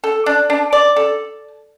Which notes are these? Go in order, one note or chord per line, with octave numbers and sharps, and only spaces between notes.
A4
D4
D4
D5
A4